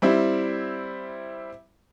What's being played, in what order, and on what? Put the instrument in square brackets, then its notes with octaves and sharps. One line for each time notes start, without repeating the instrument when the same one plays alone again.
[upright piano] G3 C4 E4